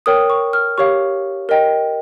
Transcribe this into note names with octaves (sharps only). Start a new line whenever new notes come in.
A#4 C#5 G5 D#6
C#6
F6
G4 C#5 F5 C#6
A#4 D#5 G5